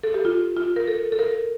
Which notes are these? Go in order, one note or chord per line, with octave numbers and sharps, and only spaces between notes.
A4
G4
F4
F4
A#4
A4
A4
A#4